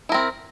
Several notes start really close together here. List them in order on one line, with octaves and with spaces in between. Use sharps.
E4 A#4 C4